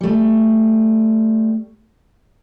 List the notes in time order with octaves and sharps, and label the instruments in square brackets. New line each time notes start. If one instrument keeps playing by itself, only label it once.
[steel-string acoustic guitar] G3 A3